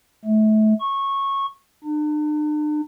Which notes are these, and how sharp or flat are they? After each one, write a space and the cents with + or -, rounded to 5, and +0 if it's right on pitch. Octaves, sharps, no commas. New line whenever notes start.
A3 -30
C#6 -15
D4 +45